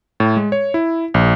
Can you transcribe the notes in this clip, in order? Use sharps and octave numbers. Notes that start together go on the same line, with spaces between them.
A2
G#3
C#5
E4
A#1